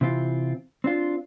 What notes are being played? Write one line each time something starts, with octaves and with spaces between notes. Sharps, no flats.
C3 E3 C4 F4
C4 D4 F4